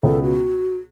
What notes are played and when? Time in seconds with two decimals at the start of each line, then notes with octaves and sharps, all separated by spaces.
0.03 C#2 B2 B3 A4
0.23 F#4